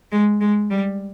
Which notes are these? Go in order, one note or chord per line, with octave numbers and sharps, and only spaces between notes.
G#3
G#3
G3